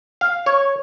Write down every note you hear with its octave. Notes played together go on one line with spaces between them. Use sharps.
F5
C#5